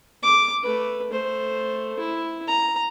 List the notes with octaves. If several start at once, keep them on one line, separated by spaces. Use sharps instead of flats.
D6
A3 B4
A3 C5
E4
A#5